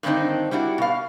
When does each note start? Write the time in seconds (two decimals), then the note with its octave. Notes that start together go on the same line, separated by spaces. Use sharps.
0.03 G2 D3 D#3 C4 D4 D#4
0.51 G3 D4 E4 F#4
0.78 B2 F5